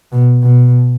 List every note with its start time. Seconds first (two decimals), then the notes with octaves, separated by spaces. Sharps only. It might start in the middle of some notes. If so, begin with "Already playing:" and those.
0.12 B2
0.43 B2